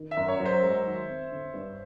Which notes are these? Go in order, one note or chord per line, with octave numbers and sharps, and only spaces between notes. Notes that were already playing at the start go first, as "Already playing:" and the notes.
Already playing: D#3
E5
F#2
C#5
F#3
C5
G#3
D#3
C4
D3
G2